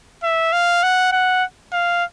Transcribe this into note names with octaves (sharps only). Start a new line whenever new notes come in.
E5
F5
F#5
F#5
F5